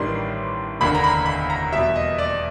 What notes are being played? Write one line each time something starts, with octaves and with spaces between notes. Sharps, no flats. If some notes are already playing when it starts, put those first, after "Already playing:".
Already playing: A1 G2 D#3 G3 C6
F1 D#2 D3 B5
A#5
B5
B5
A#5
E2 B2 G3 E5
D#5
D5